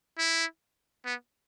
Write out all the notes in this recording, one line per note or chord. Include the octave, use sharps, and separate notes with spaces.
E4
B3